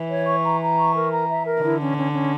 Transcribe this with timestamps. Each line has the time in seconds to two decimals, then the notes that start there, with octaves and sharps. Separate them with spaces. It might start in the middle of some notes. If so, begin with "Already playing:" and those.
Already playing: E3
0.09 C#5
0.26 C#6
0.43 A#5
0.60 A#5
0.77 C#6
0.93 A#4
1.11 A#5
1.28 E5
1.45 A#4
1.62 D3 E4
1.79 C#4
1.96 C#4
2.12 C#4